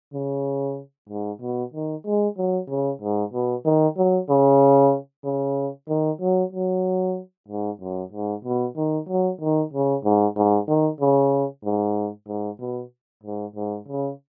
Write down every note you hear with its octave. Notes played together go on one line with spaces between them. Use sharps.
C#3
G#2
B2
D#3
G#3
F#3
C#3
G#2
B2
D#3
F#3
C#3
C#3
D#3
F#3
F#3
G#2
F#2
G#2
B2
D#3
F#3
D#3
C#3
G#2
G#2
D#3
C#3
G#2
G#2
B2
G#2
G#2
C#3